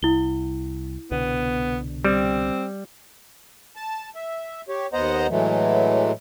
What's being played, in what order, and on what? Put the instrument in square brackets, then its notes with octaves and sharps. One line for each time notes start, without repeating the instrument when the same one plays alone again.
[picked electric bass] C2 [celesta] E4 G7
[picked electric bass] C2 B2 D3 [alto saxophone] B3
[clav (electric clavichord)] G3 [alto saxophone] C4
[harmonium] A5
E5
G4 C#5
D#2 B3 C5 D#5 F#5 A#5
A2 E3 F#3 G#3 A3